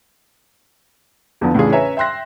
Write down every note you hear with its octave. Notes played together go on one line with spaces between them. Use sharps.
E2 D3 F3 B3
A2 C#3 E3 D4 F4 G#4
C#4 B4 C#5 E5 G#5 A#5
E5 G5 C6 F#6 A#6